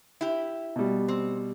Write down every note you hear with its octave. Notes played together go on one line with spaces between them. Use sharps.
E4 G4
B2 G3
C4